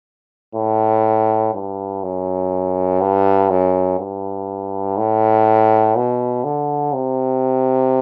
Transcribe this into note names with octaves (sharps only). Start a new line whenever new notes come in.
A2
G2
F#2
G2
F#2
G2
A2
B2
D3
C3